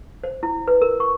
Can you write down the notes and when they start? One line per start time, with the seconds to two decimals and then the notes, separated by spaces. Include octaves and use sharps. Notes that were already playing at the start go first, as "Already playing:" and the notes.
0.24 C5
0.43 E4
0.68 B4
0.82 A#4
1.00 C#6